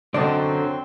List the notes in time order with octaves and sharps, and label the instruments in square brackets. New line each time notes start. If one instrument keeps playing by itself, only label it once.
[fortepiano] F#2 D#5 A5 [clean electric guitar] D3 C#4 [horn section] F#3 C4 [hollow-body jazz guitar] D5